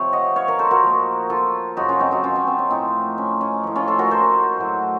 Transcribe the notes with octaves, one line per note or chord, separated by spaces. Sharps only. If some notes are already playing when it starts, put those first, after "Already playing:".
Already playing: C3 F3 C#5
D#5 F#5
C#5 F5
A#4 C#5
A4 C5
F#4 A#4
A#2 F3
F4 A4
F#2 C#3 F#3 D#4 F#4
C#4 F4
C4 D#4
D#4 F#4
C#4 F4
C#4
C4
C#4
A2 F3 C4 D#4
C#4
C#4
A2 F3
C#4 F4
F4 A4
F#4 A#4
A4 C5
A2 F#3